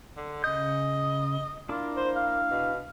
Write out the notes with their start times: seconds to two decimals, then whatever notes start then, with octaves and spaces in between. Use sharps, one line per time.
0.17 D3
0.44 C#3 D#5 G6
1.69 A#3 D4 E4 F4 D6
1.96 C5
2.16 F5
2.51 B2